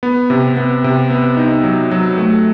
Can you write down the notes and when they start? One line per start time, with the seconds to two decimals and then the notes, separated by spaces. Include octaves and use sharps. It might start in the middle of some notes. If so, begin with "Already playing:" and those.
0.03 B3
0.30 C3
0.57 B3
0.84 C3
1.11 B3
1.37 D#4
1.64 F#3
1.91 F#3
2.17 A3